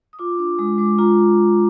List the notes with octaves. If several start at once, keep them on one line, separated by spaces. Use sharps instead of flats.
D#6
F4 D6
D4 D6
G#3 D#6
G#3 D6
F4 A#5